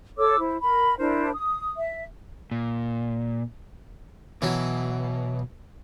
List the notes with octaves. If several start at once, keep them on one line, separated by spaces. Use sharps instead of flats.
A4 C#5 D6 E6
E4 C5
A#4 B5
D4 E4 A#4 C5
D#6
E5
A#2
B2 E3 F#3